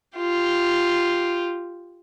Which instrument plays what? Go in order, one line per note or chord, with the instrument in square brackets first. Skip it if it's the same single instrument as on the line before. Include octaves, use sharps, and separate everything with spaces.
[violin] F4 G4